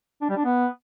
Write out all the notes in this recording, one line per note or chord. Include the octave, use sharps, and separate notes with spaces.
D4
G3
D4
B3